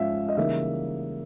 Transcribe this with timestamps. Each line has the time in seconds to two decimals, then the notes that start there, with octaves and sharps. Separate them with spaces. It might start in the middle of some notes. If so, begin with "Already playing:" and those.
Already playing: G#2 F3 C#4 E5 F5
0.29 D#5
0.37 C#3 E3 G3 A#3 D#4 E5